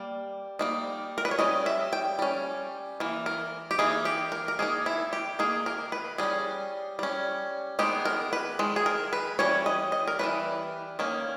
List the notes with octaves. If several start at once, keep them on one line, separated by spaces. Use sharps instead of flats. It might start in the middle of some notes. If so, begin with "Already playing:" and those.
Already playing: G3 A#3
G3 A#3 D#4
A#4
B4
C#5
G3 C#4 D#5
E5
G5
G3 C#4
E3 A#3
A#4
G4
E3 A#3 D#4 G#4
G4
A#4
A#4
D#3 A#3 D#4 G#4
E4
G4
D#3 A#3 D#4 G#4
A#4
B4
G3 C#4 G#4
G3 C#4
D#3 G#3 B3 D#4 G4
A#4
B4
D#3 G#3
G#4
A#4
B4
E3 G3 C#4 C#5
D#5
D#5
A#4
E3 G3 C#4 B4
D#3 A#3 C#4